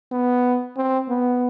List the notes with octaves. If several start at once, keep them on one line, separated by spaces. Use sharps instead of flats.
B3
C4
B3